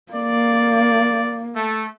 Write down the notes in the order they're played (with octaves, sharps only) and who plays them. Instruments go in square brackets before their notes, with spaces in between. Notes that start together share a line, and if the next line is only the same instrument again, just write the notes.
[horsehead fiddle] A#3 [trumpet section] D5
[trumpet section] A3